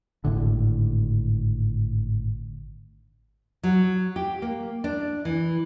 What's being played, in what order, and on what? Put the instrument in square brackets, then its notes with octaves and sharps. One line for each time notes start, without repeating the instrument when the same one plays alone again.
[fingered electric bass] G#1 A2 D3
[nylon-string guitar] F#3
G4
A#3
D4
E3